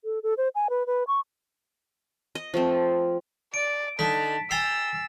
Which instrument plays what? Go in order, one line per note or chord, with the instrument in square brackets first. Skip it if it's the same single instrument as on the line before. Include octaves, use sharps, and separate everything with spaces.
[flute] A4
A4
C5
G#5
B4
B4
C#6
[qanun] D#5
F3 A3 C4
[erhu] D5 [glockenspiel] D7
[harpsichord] D3 D#4 [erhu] A5 [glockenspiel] B6
[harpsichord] G5 A#5 [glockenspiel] G#5 A6 C7 [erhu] E6